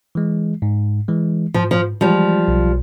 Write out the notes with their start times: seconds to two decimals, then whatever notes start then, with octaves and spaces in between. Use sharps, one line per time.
0.15 E3 G#3
0.62 G#2
1.08 E3 G#3
1.54 G#2 F3
1.71 F3
2.01 E3 F3 G3 G#3
2.48 B1